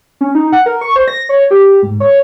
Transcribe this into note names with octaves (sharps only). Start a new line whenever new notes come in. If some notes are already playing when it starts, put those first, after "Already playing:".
C#4
D#4
F#5
A#4
C#6
C5
A#6
C#5
G4
G#2
C#5